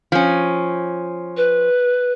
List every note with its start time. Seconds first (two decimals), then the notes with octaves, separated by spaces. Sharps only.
0.12 F3 C#4
1.37 B4